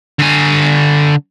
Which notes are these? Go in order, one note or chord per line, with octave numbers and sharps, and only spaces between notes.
D3 G#5